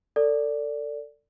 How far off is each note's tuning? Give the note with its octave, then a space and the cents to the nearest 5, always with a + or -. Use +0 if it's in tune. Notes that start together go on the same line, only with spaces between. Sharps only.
A4 +25 D5 -10